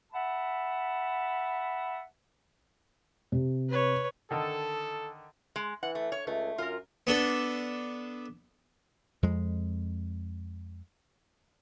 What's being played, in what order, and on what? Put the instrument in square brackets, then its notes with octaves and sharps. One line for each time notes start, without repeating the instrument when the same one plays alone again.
[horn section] E5 F#5 A5 B5
[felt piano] C3
[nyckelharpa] B4 C#5
[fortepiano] D3 D#3 [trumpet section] A4
[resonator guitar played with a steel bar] G#3
[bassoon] E3 [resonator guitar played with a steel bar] F#5
[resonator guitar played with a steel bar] A3
C#5
[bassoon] C#2 [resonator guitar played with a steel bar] A3
[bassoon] F#2 [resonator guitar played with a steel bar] F4 A#4
[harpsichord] B3 D4 A4
[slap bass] F2 G#3